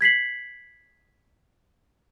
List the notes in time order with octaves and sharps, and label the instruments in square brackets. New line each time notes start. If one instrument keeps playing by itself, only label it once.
[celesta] G#6 B6 C7 F#7